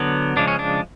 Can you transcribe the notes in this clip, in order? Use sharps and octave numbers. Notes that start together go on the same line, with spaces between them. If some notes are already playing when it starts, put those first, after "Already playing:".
Already playing: D3 F#3 B3
C#3 F3 G#3 D4
C#4
D4